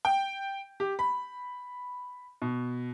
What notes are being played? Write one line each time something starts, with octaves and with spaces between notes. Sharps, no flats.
G5
G4
B5
B2